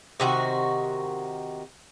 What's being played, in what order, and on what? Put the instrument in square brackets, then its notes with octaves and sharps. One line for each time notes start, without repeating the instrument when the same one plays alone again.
[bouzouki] C3 D#3 F#4